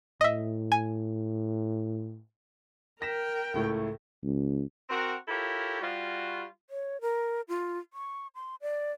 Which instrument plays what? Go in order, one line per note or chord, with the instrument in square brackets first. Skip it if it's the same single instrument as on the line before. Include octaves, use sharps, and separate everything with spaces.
[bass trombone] A2 [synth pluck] D#5 E5
[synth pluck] G#5
[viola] A#4 G5 [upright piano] A#6 B6 E7
[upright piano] C#2 A2 A3
[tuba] C#2
[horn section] C4 F#4 A#4
E4 F4 G4 A4 A#4 C#5
G3 F4 F#4
[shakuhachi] C#5
A#4
F4
C#6
C6
D5